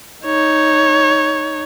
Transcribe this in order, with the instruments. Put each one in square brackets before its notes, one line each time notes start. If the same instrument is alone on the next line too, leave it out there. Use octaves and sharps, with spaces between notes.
[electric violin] D#4 C#5